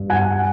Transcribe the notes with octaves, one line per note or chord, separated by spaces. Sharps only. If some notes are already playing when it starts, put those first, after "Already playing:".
Already playing: G2
F#5 G#5